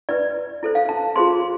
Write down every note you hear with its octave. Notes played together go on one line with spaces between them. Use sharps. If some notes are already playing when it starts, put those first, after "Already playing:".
E4 B4 D5
E4 A4 C5
F5
A5
F4 G#4 C5 C6